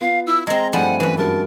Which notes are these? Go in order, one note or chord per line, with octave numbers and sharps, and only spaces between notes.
B3 F4 F5
E4 E6
G#3 C4 D#5 A#5 G#6
G2 F3 G3 A3 E4 F#5 G#5
F#2 E3 B4
G2 G#3 F#4 A#4 A5